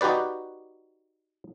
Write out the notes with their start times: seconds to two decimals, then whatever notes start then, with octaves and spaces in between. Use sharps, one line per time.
0.01 D#4 F#4 G4 B4 D5